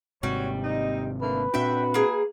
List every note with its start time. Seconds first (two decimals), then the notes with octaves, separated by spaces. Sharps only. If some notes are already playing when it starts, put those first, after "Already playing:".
0.23 G#1 G#2 C3 G3 F#4 C#5
0.64 C4 D#4
1.22 D3 A3 A#3 B4
1.54 A#2 C4 D4 F#4 E5 G5
1.94 A#3 G#4